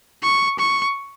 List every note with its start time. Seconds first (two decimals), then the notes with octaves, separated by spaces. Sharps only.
0.24 C#6
0.59 C#6